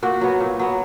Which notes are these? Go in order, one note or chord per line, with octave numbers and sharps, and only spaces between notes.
A#2 F#4
F#3 B3
A#2
F#3 B3